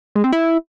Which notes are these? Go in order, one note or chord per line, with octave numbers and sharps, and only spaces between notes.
G#3
C4
E4